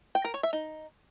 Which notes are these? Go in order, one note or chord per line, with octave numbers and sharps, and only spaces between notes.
G5
A#4
C#5
E5
D#4